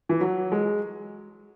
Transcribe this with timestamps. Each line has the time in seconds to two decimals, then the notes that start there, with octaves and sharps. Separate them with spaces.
0.09 E3
0.21 F#3
0.52 G#3